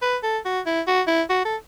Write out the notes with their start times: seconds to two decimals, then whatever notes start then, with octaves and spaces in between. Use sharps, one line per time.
0.02 B4
0.23 A4
0.45 F#4
0.66 E4
0.87 F#4
1.07 E4
1.30 F#4
1.45 A4